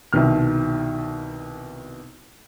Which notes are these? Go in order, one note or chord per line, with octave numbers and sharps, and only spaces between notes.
C2 B2 D#3 F6